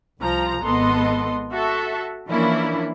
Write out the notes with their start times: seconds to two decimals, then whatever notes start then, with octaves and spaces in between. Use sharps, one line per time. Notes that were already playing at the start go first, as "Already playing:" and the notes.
0.21 C2 F3 A#5
0.61 G#1 B3 A4 D#5 C6
1.52 F#4 A4 E5
2.27 E3 F3 A#3 C#4 D4 E4